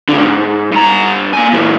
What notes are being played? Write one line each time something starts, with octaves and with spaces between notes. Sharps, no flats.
C#2 D3
G#2
G2 A#5
A#3 G#5
A#2 E3